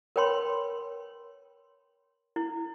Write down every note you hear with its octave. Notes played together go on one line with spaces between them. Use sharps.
A#4 B4 C#5 G5 B5 C6
E4